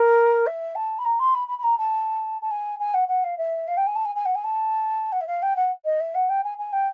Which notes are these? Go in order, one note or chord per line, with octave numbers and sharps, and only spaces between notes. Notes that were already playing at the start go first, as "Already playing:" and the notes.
Already playing: A#4
E5
A5
B5
A#5
C6
B5
B5
B5
A#5
A5
A5
G#5
G#5
F#5
F#5
F5
E5
F5
G5
G#5
A5
G#5
G#5
F#5
G#5
A5
F#5
E5
F5
G5
F#5
D#5
E5
F#5
G5
G#5
G#5
G5